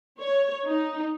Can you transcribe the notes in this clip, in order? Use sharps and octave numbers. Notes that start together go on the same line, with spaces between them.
C#5
D#4